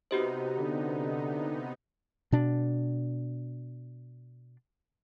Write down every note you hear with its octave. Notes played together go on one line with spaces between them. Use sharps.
C3 B3 D#4 F#4 G4 C5
D3
B2 D4